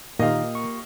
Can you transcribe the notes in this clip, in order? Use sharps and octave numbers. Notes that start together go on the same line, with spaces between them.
A#2 D#3 A#3 F4 G4 D#5 F5
C#6